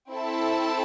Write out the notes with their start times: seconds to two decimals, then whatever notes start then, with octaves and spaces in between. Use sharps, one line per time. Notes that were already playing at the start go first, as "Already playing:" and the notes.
0.10 C4 E4 A4 E5 A5